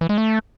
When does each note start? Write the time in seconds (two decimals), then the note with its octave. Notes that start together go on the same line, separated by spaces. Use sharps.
0.01 E3
0.09 G#3
0.18 A3